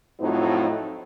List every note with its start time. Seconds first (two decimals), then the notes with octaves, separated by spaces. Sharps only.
0.20 F2 A2 F3 F#3 C4 D#4